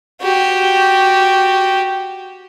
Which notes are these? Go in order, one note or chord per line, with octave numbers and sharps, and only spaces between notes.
F#4 G4